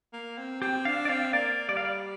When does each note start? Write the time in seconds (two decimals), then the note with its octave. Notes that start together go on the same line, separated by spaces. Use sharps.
0.13 A#3
0.38 C4
0.62 C4 G4
0.85 D4 F5
1.05 D5
1.09 C4 F5
1.25 F5
1.33 A#3 D5
1.69 G3 D5
1.77 F5
1.85 D5